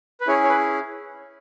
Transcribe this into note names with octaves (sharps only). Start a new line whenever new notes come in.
B4
C#4 E4 G#4 C#5
C#5
B4